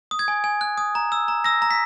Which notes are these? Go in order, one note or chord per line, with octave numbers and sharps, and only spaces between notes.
D#6
G#6
G#5
G#5
F#6
D#6
A#5
E6
A#5
E6 A#6
A#5
B6